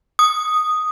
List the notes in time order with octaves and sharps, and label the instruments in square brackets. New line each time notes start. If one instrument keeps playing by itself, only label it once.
[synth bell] D#6